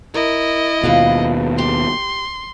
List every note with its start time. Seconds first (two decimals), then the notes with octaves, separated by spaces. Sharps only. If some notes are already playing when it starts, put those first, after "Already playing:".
0.14 E4 A#4 D#5
0.84 D#2 B2 F3 B4 F5
1.58 G4 C6